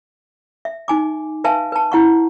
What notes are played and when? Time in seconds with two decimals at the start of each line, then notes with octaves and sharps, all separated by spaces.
0.65 E5
0.88 D#4 G#5 D6
1.44 B4 E5 F5 G#5 A5
1.72 B4 A5
1.92 E4 F#5 C#6